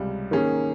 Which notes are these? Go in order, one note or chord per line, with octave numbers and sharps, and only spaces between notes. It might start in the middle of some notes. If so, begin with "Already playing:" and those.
Already playing: C#2 C3 G3
D#3 A#3 C#4 G#4